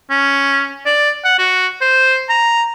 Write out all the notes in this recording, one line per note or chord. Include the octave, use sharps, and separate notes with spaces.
C#4
D5
F#5
F#4
C5
A#5